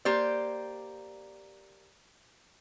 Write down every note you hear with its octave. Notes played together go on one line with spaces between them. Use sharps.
A#3 G4 C5 D5